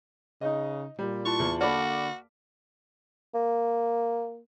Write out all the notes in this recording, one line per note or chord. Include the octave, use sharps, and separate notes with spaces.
C#3 D#4 D#5
A#2 G3
E4 F4 A5 C#6
E2
D3 A#3 F#4 D5 A5 B5 D6 F6
A#3